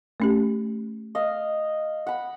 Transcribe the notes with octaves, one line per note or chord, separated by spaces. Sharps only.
A3 C#4 G4
D#5 F5
F#5 B5